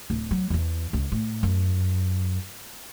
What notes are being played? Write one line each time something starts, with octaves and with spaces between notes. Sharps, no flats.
D1
F#3
E2 E3
C#2
A2
F#2